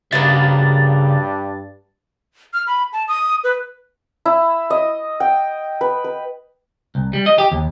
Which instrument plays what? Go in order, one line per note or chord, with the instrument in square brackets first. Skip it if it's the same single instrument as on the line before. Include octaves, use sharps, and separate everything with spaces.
[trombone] G2 [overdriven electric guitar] C#3 E5 [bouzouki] F#3 A#3 B3 [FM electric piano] A6
[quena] F6
B5
A5
D#6
B4
[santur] E4
D#5
G5
B4
B4
[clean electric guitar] C2
G3
D#5
G4
D#2